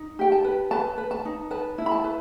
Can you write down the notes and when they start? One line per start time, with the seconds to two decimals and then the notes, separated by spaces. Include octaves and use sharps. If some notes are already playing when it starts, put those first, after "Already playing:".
Already playing: D#4
0.19 G4 G5
0.32 A5
0.44 B4
0.71 B4 A5
0.98 B4
1.11 A5
1.25 D#4
1.51 B4 A5
1.78 E4
1.86 B5
1.92 A5
2.04 B4